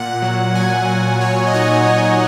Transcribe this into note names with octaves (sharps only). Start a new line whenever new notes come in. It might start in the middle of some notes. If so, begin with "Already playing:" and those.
Already playing: A#2 F#5
F#3
A#2 G#5
A#2 F#5
F#3 C#5
D#5
D#4 F#5
A#2 D#5